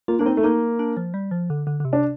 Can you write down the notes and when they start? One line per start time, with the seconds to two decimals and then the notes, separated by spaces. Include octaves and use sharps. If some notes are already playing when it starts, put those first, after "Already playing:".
0.08 A#3 F4
0.19 A#3 D4
0.26 C4 D#4
0.37 A3
0.43 A#3 D#4
0.79 D4
0.97 F3
1.14 G3
1.31 F3
1.50 D3
1.67 D3
1.80 D3
1.85 C3
1.93 D4